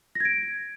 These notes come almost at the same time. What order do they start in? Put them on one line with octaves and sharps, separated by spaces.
A#6 G#6 D7